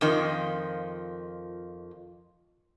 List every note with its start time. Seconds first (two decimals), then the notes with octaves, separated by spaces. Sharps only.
0.01 F2 D#3 F3